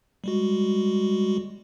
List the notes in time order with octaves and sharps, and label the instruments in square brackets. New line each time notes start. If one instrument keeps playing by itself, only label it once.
[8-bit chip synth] G3 G#3 F#4